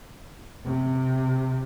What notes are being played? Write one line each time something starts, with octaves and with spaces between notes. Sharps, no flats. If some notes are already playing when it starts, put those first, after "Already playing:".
C3